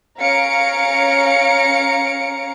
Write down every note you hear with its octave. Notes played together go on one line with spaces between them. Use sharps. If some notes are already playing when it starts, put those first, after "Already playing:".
C#4 F5 A#5 C#7 D7